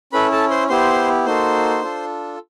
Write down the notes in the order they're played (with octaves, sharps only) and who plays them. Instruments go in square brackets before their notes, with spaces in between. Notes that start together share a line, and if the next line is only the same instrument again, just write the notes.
[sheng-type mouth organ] C#4 E4 A4 B4 B5
A4 A5
C5 C6
B3 E4 G4 C5 C6
A#3 D#4 F#4 A4 C5 C6
D4 F4 A4